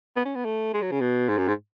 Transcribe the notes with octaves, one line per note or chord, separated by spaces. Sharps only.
B3
C#4
B3
A3
G#3
F#3
C#3
B2
G#2
F#2
G#2